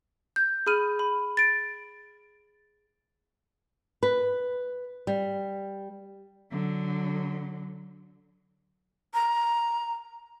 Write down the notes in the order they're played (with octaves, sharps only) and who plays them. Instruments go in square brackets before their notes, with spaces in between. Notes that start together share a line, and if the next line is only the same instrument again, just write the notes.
[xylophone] G6
G#4 B5 F6 D#7
B5
A6 D7
[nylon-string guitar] B4
G3
[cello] D3 F#3
[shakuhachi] A#5